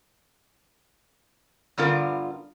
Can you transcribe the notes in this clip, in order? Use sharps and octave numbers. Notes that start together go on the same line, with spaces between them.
G2 D3 B3 F4 A#4